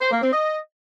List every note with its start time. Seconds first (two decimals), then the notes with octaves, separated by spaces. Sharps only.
0.01 C5
0.11 A#3
0.22 C4
0.32 D#5